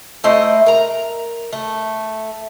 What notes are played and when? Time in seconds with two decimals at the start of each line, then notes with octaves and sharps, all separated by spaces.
0.24 A3 E4 C5 D#5
0.66 A#4 A#5
1.53 A3